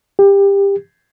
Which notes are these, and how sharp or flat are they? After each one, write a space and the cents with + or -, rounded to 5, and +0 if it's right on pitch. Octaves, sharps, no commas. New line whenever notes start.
G4 +20